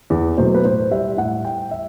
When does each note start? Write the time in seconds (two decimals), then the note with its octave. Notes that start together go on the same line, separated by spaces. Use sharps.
0.10 E2
0.37 B2 F#3 A3 C5
0.54 B4
0.64 A2 C5
0.91 G3 E5
1.17 A2 F#5
1.44 G3 G5
1.71 E5